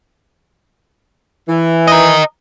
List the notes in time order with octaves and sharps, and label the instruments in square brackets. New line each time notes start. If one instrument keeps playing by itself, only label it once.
[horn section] E3
[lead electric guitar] A#4 D#5